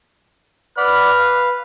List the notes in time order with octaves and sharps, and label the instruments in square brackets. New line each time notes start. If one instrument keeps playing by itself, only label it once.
[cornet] B4 [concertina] D5 F#5 B5 [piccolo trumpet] F6
[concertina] F5